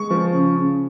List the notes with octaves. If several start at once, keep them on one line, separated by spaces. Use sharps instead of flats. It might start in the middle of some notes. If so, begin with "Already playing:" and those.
Already playing: G#3 C#6
F3
C#3
C#3